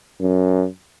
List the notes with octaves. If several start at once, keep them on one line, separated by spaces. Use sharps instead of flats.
F#2